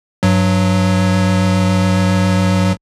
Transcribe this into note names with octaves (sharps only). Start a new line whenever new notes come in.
G2 F#3